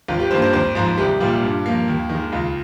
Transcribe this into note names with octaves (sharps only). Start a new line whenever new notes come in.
G#1 F4
G4
G2 D#3 A#3 C5
C5
G#1 C5
G#2 F3
C2 G4
A#2 G3 F4
G2
F3 A#3
D#2
D#3
G#3
C#2 F4